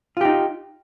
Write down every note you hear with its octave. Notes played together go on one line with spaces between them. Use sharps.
D#4 F4 G4